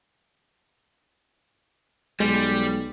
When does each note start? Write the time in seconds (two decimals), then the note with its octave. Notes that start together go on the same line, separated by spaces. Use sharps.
2.20 B1 G3 G#3